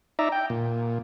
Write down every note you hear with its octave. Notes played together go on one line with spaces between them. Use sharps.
D#4 D5 E5 A#5
G5
A#2